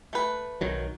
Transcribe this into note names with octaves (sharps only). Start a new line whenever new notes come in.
A3 B4
B1 D#3 F#3